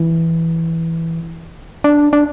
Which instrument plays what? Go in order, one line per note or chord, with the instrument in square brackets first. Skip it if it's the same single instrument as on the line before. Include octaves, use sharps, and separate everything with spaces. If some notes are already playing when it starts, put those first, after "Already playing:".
Already playing: [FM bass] E3
D4
D4